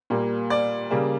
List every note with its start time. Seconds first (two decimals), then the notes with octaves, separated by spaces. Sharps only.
0.10 A#2 G3 A#3
0.50 D5
0.90 C#3 G3 A#3